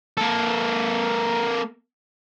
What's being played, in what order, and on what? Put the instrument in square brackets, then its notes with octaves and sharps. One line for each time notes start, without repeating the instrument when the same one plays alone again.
[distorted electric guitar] A#3 A4